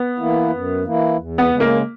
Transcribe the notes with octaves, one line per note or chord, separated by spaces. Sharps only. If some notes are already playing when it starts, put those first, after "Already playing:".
Already playing: B3
E3 A#3 E4
F#2
E3 A#3 E4
E2
B3
C#3 G#3
A#3